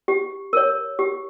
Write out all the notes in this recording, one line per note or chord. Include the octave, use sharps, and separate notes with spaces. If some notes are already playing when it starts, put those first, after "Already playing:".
G4
A#4 C#5
G4